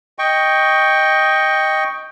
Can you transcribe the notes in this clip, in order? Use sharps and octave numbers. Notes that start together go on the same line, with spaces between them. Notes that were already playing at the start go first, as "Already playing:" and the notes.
D#5 G5 C#6